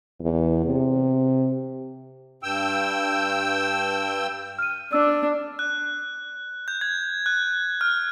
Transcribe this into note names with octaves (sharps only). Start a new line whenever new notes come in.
E2
C3
G2 G5 E6
F6 D#7
D4 E6
F#6
G6
G#6
F#6
F6